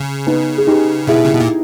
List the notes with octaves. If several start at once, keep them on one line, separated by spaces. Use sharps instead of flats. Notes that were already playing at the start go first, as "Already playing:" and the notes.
Already playing: C#3
B3 D#4
G#4
D#4 G4
B2 E4 G#4
C#3
B2
A#2